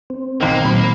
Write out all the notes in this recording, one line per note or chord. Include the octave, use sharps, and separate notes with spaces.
C4
B1 D#3 A#3
A#2 D#3 F#3 B5